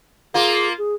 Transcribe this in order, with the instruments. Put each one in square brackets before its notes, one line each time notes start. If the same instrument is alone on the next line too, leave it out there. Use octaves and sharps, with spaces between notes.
[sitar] A#3 F4 [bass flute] G#4
[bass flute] G#4